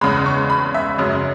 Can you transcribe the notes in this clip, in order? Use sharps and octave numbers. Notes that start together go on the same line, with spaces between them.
E2 C#3 G#3 B5
C#6
B5
E5
F#2 C#3 G#3